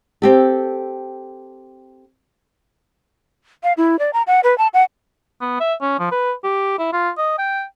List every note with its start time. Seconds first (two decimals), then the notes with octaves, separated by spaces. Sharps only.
0.22 C4 G4 A4
3.64 F5
3.77 E4
3.99 D5
4.13 A#5
4.27 F#5
4.44 B4
4.58 A5
4.74 F#5
5.41 B3
5.60 E5
5.82 C#4
5.99 F3
6.12 B4
6.44 G4
6.79 E4
6.93 F4
7.18 D#5
7.39 G5